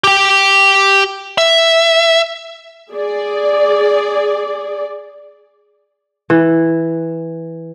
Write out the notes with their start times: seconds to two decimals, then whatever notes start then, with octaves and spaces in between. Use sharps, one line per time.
0.04 G4 G5
1.38 E5
2.92 G#4 D5
6.30 E3